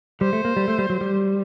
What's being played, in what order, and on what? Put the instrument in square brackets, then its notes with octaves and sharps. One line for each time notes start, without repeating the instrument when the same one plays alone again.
[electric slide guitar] G3 [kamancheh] C5
[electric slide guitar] A3
A#3
G3
A3
G3
F#3
G3